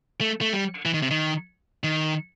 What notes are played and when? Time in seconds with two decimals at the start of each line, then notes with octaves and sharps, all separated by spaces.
0.21 A3
0.41 A3
0.53 G3
0.85 E3
0.94 D#3
1.02 C3
1.11 D#3
1.84 D#3